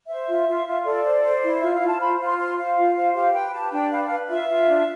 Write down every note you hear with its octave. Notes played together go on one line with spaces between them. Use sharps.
C5 E5
F4
F4
F4
A4 D5
C5
C5
E4
F4 E5
F5
F4
A5
C5 B5
F4
C6
C5 C6
C5 F5
F4
C5
G4 F5
B4 G5
G4 A5
D4 G5
B4 F5
F5
B4
F4 E5
F4
D4